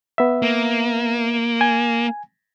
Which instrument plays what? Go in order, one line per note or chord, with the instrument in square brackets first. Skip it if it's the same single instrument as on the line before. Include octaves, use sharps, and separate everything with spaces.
[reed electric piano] B3 E5
[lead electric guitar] A#3
[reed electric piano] G#5